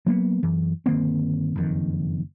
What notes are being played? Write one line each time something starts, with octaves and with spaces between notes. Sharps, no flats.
F#3 A#3 B3
F#2 E3
G1 D#3 A#3 C4
F#1 F2 D#3